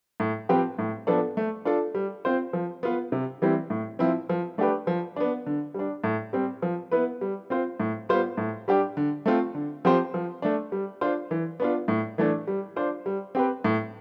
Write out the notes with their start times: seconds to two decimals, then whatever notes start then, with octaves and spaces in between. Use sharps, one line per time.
0.20 A2
0.49 F3 C4 G4 B4
0.79 A2
1.07 F3 B3 D4 A4
1.37 A3
1.65 D4 F4 A4
1.95 G3
2.25 C4 F4 C5
2.53 F3
2.83 B3 F4 B4
3.12 C3
3.42 E3 G3 C4 E4
3.70 A2
3.99 F3 C4 E4
4.29 F3
4.58 A3 D4 G4 B4
4.87 F3
5.16 B3 D4
5.46 D3
5.74 G3 D4
6.04 A2
6.33 G3 C4
6.62 F3
6.91 B3 E4 B4
7.21 G3
7.50 C4 F4 C5
7.80 A2
8.09 G3 B3 F4 C5
8.37 A2
8.68 G3 D4 G4
8.97 D3
9.26 A3 C4 F4
9.55 D3
9.85 F3 C4 G4 C5
10.14 F3
10.42 A3 D4
10.72 G3
11.01 D4 F4 C5
11.31 E3
11.60 B3 D4 F4
11.88 A2
12.18 E3 A3 D4
12.47 G3
12.76 D4 F4 C5
13.06 G3
13.35 C4 G4 B4
13.64 A2